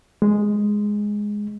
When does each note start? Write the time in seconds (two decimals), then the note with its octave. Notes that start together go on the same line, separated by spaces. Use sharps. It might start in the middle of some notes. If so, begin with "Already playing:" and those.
0.22 G#3